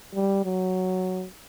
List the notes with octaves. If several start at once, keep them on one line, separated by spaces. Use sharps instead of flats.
G3
F#3